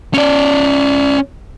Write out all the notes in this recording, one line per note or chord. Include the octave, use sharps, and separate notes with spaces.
C#4 D5